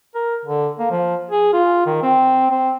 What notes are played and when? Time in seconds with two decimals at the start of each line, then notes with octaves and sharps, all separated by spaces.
0.15 A#4
0.45 D3
0.79 A#3
0.91 F3
1.31 G#4
1.53 F4
1.86 D#3
2.03 C4
2.51 C4